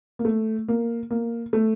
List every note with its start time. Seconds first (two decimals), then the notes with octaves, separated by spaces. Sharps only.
0.19 A#3
0.25 A3
0.68 A#3
1.10 A#3
1.53 A3